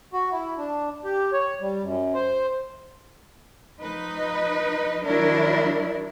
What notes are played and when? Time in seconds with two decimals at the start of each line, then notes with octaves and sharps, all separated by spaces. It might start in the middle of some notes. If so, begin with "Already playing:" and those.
0.13 F#4
0.32 E4
0.58 D4
1.04 G4
1.33 C#5
1.61 G3
1.83 F#2
2.14 C5
3.79 F3 D#4 B4
5.04 D#3 F#3 D4 E4 A#4